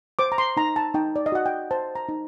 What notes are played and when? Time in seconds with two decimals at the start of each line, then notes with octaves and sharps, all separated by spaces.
0.19 C5 D6
0.32 A#5
0.38 C6
0.57 D#4 A#5
0.76 A5
0.94 D#4 G5
1.16 D5
1.26 D#5
1.32 F#4 F#5
1.46 G5
1.71 C5 A5
1.95 A#5
2.09 D#4